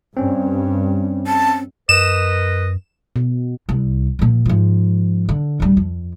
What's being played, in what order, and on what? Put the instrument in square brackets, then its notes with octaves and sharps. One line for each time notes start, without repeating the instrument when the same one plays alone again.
[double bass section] G2 [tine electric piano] C4 C#4
[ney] A5
[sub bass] F#2 [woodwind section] A#4 B4 D#5 [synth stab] E7
[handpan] B2
[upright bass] C2
A#2 F3
G#2 F3
D3
D1 G3
F2